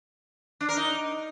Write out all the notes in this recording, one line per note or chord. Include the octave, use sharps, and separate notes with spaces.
D4
A#4
D#4